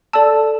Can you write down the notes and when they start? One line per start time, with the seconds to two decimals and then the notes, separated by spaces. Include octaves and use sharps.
0.13 A4 D5 A5 E6